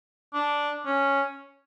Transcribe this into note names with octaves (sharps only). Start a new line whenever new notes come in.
D4
C#4